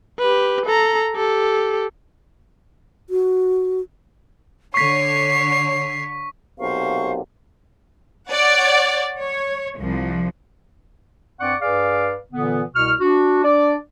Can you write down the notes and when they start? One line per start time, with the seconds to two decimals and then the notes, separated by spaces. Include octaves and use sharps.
0.19 G4 B4
0.66 A4 A#5
1.15 G4 A4
3.10 F#4
4.74 D3 C#5 C#6 B6 C7
6.60 B1 C3 A#3 C5 F5 C#6
8.30 C#5 D5 F#5
9.18 C#5
9.76 C2 F3
11.40 G2 C4 D5 F#5 C#6 D6
11.61 G2 G#4 B4 D5 F5 D6
12.32 A#2 D3 E3 B3
12.75 C2 B2 C#6 F6
13.00 D4 F#4
13.44 D4 D5